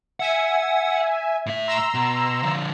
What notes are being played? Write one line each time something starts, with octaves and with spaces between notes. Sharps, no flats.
E5 F#5 G#5
A2 E5
A#5 C6 E6
B2
D3 F3